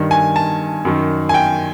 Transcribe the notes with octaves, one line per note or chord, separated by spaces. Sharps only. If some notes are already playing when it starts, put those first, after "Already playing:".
Already playing: G2 D#3
G#5
A5
F#2 D#3
G#5
G5